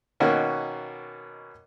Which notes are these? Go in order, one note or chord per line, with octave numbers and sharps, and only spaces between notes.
B2 D#3 A#3 C#4 F#4